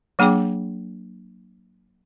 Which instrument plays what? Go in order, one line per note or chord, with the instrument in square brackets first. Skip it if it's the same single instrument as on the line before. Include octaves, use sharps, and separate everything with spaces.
[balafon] F#3 A#3 D4 G#4 G5 D6